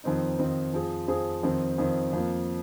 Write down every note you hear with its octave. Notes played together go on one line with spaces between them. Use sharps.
F2 D#3 C4 D#4
F2 D#3 C4 D#4
F2 F3 C4 G#4
F2 F3 C4 G#4
F2 D#3 C4
F2 D#3 C4
F2 F3 A#3